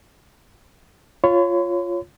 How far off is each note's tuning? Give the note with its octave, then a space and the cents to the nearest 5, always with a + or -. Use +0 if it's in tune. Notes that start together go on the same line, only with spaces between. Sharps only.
F4 +0 C#5 +0 B5 +45